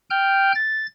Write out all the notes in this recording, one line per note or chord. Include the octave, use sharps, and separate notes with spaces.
G5 F6 G6
A6